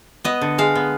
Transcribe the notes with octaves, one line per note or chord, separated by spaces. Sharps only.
B3 D#5
D3
G#3 F5
B3